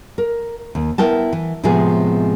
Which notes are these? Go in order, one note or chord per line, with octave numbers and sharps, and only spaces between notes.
A#4
D#2
B3 E4 A#4 G5 A5
E3
A2 C3 F3 G#3 B3 G#4